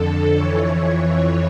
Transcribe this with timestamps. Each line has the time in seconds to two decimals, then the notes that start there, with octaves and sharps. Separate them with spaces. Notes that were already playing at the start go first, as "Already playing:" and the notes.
Already playing: F2 D3 A4
0.37 F2 E3 C#5